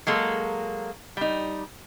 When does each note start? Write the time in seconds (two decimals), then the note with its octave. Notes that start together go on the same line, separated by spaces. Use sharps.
0.07 F#3 G#3 A#3 A4
1.17 G3 D#4